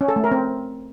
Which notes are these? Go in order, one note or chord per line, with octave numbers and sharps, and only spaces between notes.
C#4
A4
A3
A#4
C4